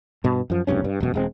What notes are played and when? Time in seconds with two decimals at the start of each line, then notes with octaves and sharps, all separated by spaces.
0.24 G2 B2
0.50 F#2 F3
0.67 F1 B1 G2 C#4
0.84 G2
1.00 E1 F#2 B2
1.14 E1 G#3 C4